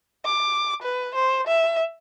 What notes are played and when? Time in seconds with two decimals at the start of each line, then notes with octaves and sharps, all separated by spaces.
0.25 D6
0.83 B4
1.15 C5
1.47 E5